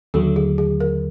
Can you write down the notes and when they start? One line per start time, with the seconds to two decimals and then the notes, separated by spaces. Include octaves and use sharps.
0.14 D#2 D3 F#3 A3 A4
0.36 G#4
0.58 G#4
0.80 A#4